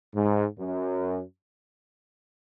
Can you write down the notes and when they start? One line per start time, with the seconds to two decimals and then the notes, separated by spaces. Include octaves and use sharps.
0.15 G#2
0.59 F#2